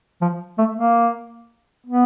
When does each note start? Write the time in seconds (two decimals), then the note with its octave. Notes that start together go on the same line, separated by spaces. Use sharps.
0.22 F3
0.58 A3
0.77 A#3
1.86 B3